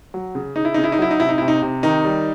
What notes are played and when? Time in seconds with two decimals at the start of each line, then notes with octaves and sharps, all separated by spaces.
0.14 F#3
0.35 C#3
0.56 C#3 D#4
0.65 E4
0.74 C#3 D#4
0.84 E4
0.92 D#4
0.99 F#3 E4
1.11 D#4
1.19 C3 E4
1.29 D#4
1.38 C3 E4
1.48 D#4
1.62 C3
1.83 D#3 D#4
2.05 G3